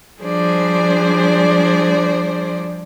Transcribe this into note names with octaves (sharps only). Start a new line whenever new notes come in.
F3 G3 D4 G#4 C5 D5